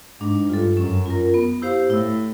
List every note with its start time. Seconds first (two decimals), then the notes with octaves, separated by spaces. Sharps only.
0.21 G#2 D4
0.49 G2 F4 A4
0.77 F#2 C#4
1.06 F4 A#4
1.34 B3
1.62 E4 G4 C5 F5
1.90 A2 E4